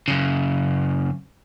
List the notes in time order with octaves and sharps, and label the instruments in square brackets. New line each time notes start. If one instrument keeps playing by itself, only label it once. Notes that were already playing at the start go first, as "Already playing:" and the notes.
[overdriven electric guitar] F#2 C#3